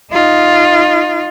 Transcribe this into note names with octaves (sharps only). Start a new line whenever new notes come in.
D#4 F4